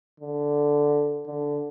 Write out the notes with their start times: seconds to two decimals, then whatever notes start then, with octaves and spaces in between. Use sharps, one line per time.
0.20 D3
1.26 D3